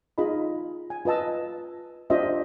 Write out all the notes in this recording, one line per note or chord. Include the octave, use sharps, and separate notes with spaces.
D#4 F4 G#4 D#5 B5
G#5
F4 B4 D#5 A5 E6
D4 F4 G4 C5 D#5 E5